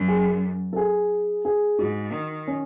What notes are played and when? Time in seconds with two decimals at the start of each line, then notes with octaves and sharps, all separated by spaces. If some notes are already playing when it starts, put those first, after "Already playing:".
Already playing: F#2
0.08 G#4
0.73 A4
0.76 G#4
1.45 G#4
1.79 G#2 F#4
2.13 D#3
2.48 C#4